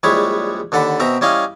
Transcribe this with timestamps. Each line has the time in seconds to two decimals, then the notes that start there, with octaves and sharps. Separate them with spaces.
0.03 A#1 G3 G#3 E4 C#5 B5
0.72 D#2 D3 A4 F#5 B5
1.00 B2 C4 E5 A#5
1.21 G3 C#4 E4 D#5 F5